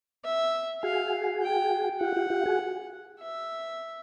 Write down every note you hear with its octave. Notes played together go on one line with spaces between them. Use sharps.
E5
F#4 G#4 F5
G5
F4 G4 F#5
F4 G4
F4 G4
F#4 G#4
E5